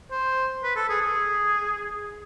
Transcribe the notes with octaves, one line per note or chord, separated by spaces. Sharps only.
C5
B4
A4
G#4
G#4